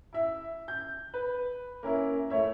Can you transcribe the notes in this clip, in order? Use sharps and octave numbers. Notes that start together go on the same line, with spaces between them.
E4 E5
G6
B4
A#3 C#4 E4
A3 E4 C#5 E5